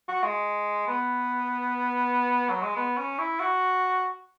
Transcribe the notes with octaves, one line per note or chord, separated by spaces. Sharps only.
F#4
G#3
B3
F#3
G#3
B3
C#4
E4
F#4